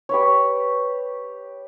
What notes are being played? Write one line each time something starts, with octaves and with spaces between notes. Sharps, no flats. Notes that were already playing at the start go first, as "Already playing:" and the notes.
G4 B4 C#5